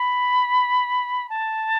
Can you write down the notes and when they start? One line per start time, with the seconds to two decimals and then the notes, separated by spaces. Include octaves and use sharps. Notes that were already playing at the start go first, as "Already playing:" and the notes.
Already playing: B5
1.29 A5